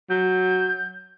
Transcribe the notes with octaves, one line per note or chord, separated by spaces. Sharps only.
F#3 G6